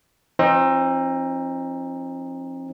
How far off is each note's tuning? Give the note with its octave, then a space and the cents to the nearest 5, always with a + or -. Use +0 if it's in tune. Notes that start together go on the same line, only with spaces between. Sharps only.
F3 -35 C4 +35 D#4 +0